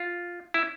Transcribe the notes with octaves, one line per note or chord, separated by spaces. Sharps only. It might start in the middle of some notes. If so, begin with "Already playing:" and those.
Already playing: F4
E4